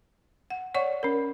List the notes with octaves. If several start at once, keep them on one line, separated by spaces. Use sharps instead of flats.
F#5
C#5 D5 F#5 C#6
C#4 A#4